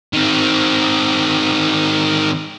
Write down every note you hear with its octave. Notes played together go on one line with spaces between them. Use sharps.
D#3 C4